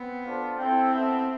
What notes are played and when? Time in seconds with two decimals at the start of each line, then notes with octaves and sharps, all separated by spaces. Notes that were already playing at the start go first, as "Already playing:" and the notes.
Already playing: B3 C4
0.25 D4 F4 A4 C5 F5
0.59 C4 E4 A4 C5 E5 G5
0.93 B3 E4 A4 E5